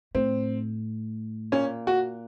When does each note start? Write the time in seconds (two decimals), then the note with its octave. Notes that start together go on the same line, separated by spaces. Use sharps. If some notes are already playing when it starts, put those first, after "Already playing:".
0.15 A2 C4
1.52 A#2 C#4
1.87 F#4